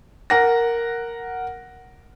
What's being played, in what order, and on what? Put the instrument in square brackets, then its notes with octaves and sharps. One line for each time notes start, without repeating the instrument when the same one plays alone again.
[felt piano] A#4 F#5 A#6